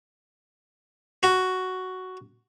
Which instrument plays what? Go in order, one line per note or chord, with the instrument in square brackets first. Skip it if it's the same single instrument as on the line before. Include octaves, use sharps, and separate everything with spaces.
[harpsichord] F#4